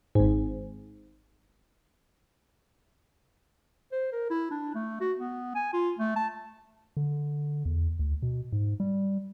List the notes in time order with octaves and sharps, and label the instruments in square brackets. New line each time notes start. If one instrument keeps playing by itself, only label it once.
[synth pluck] G#1 G#2
[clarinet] C5
A#4
E4
D4
A3
F#4
B3
G#5
F4
A3
A5
[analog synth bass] D3
E2
D2
B2
G#2
G3